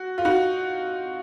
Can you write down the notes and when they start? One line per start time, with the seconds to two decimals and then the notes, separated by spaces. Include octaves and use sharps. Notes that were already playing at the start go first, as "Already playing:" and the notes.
Already playing: F#4
0.18 F4
0.25 D#4 F#4